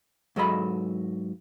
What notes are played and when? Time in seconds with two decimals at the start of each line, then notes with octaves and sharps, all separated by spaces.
0.36 G#2 F#3 A4 D#5 B5